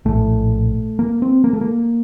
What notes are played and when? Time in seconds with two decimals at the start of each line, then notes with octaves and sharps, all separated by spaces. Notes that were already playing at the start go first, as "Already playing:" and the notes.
0.05 A#1 A2 A3
0.99 A#3
1.22 C4
1.44 A#3
1.53 A3
1.61 A#3